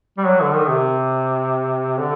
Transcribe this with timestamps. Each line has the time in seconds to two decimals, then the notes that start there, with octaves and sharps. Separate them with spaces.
0.18 G3
0.26 F#3
0.41 D3
0.55 D#3
0.70 C3
2.00 D3